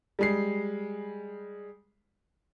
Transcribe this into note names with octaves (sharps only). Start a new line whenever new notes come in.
G3 G#3 C7